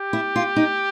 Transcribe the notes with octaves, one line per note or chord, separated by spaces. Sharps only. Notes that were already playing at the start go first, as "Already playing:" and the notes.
Already playing: G4
E4
F4
D#4